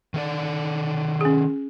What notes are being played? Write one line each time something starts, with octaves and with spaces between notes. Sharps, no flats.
D#3 A4 D5
C#4 G#4